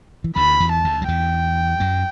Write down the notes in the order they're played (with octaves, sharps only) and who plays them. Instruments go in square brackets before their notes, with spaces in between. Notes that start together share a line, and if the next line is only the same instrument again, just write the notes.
[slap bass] E3
[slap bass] D2 D3 [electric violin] B5
[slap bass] E2 E3
[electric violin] A5
[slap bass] D2 D3
F#3
[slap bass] E2 E3 [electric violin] G5
[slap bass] F#2 F#3